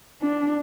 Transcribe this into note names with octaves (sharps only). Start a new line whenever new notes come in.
D4